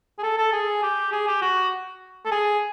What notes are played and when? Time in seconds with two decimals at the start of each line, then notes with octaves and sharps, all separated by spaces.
0.18 G#4
0.23 A4
0.38 A4
0.52 G#4
0.82 G4
1.12 G#4
1.27 G4
1.42 F#4
2.25 A4
2.31 G#4